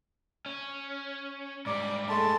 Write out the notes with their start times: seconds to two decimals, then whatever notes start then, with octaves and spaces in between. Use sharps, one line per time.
0.46 C#4
1.66 G#2 G3 D5
2.09 G#3 A3 A5